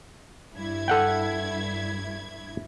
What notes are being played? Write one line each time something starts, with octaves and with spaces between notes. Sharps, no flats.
G2 E4 G#6
A4 F#5 G5